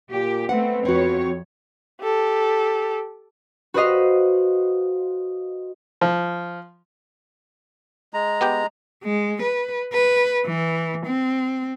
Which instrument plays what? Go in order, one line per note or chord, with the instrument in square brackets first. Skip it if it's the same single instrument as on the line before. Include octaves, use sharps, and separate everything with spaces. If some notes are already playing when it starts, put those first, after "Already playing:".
[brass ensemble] A#2 [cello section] G4
[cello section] A3 C4 [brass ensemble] B3 B4 [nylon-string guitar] F#5
[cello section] F2 C#5 [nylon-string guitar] C4 F#4
[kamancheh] G4 A4
[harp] F#4 B4 C5 D#5 F5
[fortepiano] F3
[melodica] G#3 A#5
[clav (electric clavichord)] B3 G4 G5
[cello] G#3
B4
B4
E3
C4